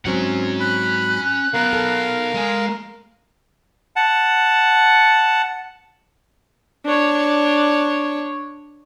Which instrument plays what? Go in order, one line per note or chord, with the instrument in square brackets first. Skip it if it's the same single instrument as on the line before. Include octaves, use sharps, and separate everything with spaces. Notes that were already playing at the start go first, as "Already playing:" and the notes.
[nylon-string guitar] G#2 F#3 C4 [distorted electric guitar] C#4 F#5
[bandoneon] B5 [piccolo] F#6
[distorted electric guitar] F#3 B3 [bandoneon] A#4 F5
[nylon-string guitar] A4
[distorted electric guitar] G#3 G#5
[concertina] F#5 A5
[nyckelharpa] D4 C#5